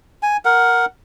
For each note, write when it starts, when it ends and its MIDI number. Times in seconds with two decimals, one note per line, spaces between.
0.23 0.37 80
0.45 0.86 70
0.45 0.86 78